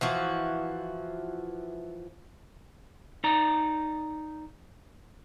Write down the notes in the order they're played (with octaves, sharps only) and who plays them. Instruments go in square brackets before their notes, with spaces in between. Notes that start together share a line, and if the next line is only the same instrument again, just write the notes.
[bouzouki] E3 F3 F#4
[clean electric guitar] D#4 D5 A#5